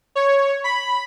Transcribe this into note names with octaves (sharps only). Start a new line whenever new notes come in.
C#5
B5